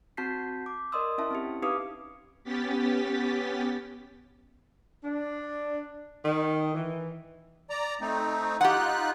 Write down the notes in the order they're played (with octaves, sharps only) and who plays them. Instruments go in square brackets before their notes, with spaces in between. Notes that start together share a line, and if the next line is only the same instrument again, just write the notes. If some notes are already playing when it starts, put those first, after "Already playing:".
[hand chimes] C4 F#4 A5 G6 B6 C7
D6
A#4 D5 D#5 C6 D#6 E6
C#4 E4 E5 A5
C4 C#4 G4
D#4 G4 B4 F5 D6 D#6
[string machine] B3 C#4 G4 A6 B6
[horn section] D4
D#3
E3
[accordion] D5 A#5
A3 C4 D#4
[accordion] D#4 F4 F#6 [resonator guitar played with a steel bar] G4 F#5